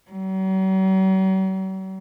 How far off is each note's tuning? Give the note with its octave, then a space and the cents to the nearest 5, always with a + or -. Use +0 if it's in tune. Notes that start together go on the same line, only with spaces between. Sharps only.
F#3 +45